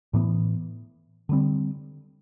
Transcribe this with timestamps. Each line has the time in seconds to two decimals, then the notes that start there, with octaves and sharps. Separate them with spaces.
0.13 A2 E3 B3
1.29 D3 G3 C4